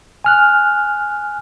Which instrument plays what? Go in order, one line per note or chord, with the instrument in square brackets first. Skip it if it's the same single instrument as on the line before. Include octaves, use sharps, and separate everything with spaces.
[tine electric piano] G#5 F6 F#6